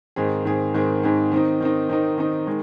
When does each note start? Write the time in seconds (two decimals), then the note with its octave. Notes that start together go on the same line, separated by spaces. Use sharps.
0.16 G#2 D#3 C4 G#4
0.45 G#2 D#3 C4 G#4
0.74 G#2 D#3 C4 G#4
1.03 G#2 D#3 C4 G#4
1.32 D#3 C4 D#4
1.60 D#3 C4 D#4
1.89 D#3 C4 D#4
2.18 D#3 C4 D#4
2.47 D#3 G#3